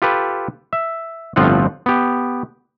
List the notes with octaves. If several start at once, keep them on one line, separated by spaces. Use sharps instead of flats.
F4 G4 A4 B4
E5
G1 A2 F3 C4 F4 F#5
B3 G4